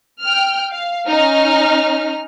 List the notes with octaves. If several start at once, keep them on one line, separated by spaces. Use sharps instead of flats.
G5 F6
F5
C#4 D#4 F6